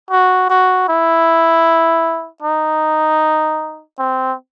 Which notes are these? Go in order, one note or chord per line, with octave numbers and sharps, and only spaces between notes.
F#4
F#4
E4
D#4
C4